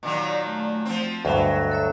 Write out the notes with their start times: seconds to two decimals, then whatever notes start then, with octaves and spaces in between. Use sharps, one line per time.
0.03 A#2 D#3 F#3
0.47 A3
0.85 F3 C4
1.25 D2 G2 F#3 A4 D#5
1.71 A4 C#5 E5